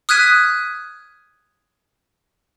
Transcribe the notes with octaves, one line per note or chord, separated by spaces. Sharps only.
D#6 F6 F#6 G#6 B6 D#7